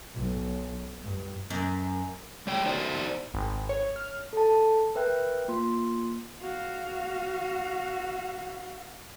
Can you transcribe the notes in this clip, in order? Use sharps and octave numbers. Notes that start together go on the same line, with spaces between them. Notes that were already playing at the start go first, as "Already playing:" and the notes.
B1
G2
F#2
G3 C#5 G5
D#4 C5 D5
G#1
C#5
F6
A4 A5
A#4 B4 E5 G5 F#6
A#3 F4 C6
F#4 F5